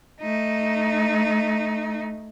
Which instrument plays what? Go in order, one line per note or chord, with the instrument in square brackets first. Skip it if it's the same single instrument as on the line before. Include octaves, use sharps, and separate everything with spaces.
[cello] A3 D#4